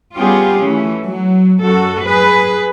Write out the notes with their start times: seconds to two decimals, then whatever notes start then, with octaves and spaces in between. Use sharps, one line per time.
0.17 G3 B3 C#4 F4 G4 G#4
0.60 E3 A3 C#4
1.07 F#3
1.63 F#2 F#4 A4
2.05 G#4 B4